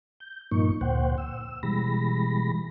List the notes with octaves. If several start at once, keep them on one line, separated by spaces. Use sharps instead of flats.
G6
G2 A#2 F3 A#3 D#4 C#6
D2 A#2 C5 F#5 G5
E6
B2 E3 G3 G#3 B5 A#6